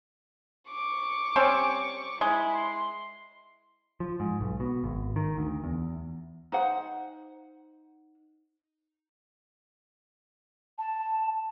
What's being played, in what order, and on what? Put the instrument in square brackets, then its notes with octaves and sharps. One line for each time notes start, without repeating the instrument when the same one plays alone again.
[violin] C#6 D6
[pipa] G3 C4 C#4
[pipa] G#3 [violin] E4
[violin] C6
[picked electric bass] F3
G#2
B1
B2
G#1
D#3
D2
E2
[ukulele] D#4 C5 F#5
[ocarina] A5